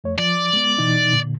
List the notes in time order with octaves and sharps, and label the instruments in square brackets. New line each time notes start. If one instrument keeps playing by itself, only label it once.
[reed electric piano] F2 A3 C#5
[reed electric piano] F3 [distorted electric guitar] D5
[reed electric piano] G#3 B3
B2 E3 D#4
A#2 D3